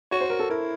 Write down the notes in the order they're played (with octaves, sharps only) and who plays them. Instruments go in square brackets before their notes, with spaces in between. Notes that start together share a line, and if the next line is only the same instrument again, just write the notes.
[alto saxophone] F#4 [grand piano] C#5
[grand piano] C5
A#4
A4
[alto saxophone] E4 [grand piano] A#4